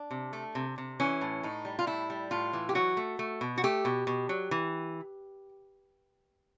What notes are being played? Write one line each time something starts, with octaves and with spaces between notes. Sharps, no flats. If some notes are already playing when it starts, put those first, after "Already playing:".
Already playing: D4
C3
A3
C3
C3
E3 C#4
A2
A2 D#4
G3
F4
A2 E4
G3
A2 F4
E3
G4
F#3 F#4
A3
A3
B2
F#4
A3 G4
B2
B2
F#3
E3